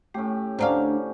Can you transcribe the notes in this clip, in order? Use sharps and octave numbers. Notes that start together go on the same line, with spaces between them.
A2 A3 C#4 G4
D2 D3 C#4 D4 C5 F5 A#5